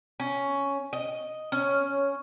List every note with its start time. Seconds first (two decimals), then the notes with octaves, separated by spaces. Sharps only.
0.20 C#4
0.93 D#5
1.52 C#4